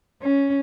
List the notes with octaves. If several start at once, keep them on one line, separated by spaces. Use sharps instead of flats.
C#4